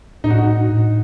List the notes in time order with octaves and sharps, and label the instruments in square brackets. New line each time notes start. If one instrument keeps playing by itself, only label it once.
[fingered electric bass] A2 [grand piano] D#4
[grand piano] F#4
D#4
[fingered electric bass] D4
A2